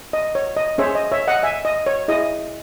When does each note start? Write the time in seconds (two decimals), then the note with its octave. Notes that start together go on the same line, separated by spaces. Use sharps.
0.13 D#5
0.35 C#5
0.56 D#5
0.78 C#4 G#4 C5 C#5 E5
0.95 D#5
1.12 C#5 E5
1.28 D#5 F#5
1.43 E5 G#5
1.65 D#5
1.87 C#5
2.08 E4 G#4 D#5